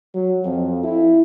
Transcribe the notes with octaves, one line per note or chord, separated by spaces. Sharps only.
F#3
F2
E4